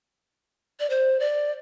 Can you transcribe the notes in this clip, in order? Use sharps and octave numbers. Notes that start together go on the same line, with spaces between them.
D5
C5
D5